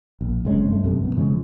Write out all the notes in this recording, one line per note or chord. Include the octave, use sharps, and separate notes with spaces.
A#1
F#1 C3 G#3 C#4
G2 A3
F#2 C3
F#2 B2
E1 C#3 F3 G#3